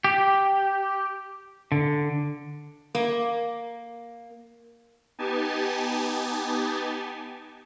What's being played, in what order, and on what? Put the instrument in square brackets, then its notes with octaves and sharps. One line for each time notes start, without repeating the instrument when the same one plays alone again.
[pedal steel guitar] G4
D3
[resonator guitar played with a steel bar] A#3
[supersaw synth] B3 D#4 G4 G#5 A5